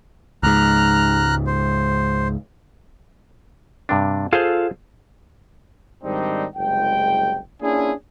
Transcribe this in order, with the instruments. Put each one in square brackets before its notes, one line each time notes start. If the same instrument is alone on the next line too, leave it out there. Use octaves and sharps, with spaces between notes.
[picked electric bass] C#2 G#2 [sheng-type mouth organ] A#5 F6 F#6
[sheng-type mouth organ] C5
[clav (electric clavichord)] G2 C3 D4
[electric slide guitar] F4 A4 F5 [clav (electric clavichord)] G#4 C5
[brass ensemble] G#2 D#3 G3 C4 D4 D#4
F#1 C2 G#3 G5
A#3 C#4 D4 E4 F4 G#4